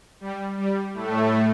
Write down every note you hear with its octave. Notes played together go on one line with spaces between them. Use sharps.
G3
G3
A2 A3